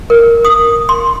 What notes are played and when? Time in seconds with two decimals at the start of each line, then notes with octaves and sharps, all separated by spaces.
0.10 A#4
0.45 D#6
0.89 C6